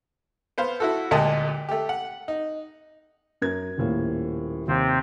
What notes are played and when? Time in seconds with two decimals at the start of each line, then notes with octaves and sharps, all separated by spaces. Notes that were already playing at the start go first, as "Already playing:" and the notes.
0.58 B3 C5 F5
0.80 E4 F#4 A4
1.11 D2 A#2 G#3 G4 D#5 A5
1.69 A3 G4
1.89 F#5
2.28 D#4
3.42 F#2 A#4 G#6
3.78 D#1 A2 A#3
4.68 D#2 C3 C4